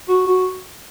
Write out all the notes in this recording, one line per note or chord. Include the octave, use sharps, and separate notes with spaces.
F#4
F#4